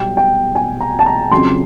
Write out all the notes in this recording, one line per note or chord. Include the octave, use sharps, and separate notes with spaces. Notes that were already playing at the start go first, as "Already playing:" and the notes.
Already playing: B1 B2 G3 G5
G5
G#5
A#5
A5
A#5
F2 C#3 F#3 C6